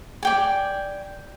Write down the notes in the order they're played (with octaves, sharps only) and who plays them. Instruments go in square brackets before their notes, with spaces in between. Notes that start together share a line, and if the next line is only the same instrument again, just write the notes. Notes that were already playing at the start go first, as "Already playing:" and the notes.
[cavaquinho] D5 G5 G#5